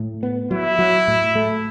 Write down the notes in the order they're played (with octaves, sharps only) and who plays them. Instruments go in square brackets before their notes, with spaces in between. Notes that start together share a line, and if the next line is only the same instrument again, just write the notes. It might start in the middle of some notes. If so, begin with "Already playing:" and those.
Already playing: [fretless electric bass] A2
B3
[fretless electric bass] F#3 [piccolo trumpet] E4
[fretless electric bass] F#3
A2
A3